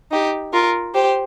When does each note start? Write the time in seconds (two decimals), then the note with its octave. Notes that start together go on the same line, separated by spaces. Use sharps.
0.11 D#4 G4
0.53 F4 A#4
0.94 G4 C5